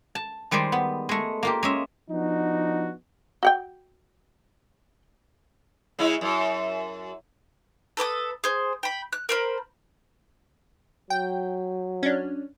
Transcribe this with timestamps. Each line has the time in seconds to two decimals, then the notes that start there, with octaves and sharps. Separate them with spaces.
0.15 A5
0.51 D#3 G3 G#3 C5 D5
0.72 B3
1.09 G#3 A3
1.43 A#3 F4 G4
1.63 G#3 C#4 E5
2.10 F3 B3 D4 D#4 F#4
3.43 F#4 F#5 G5
5.99 C#3 G#3 E4
6.21 F#2
7.97 A4 B4 D6 D#6
8.44 G#4 C5
8.83 G5 B5
9.13 F#6
9.29 A#4 C5 B5
11.10 F#3 G5
12.03 C#4 D4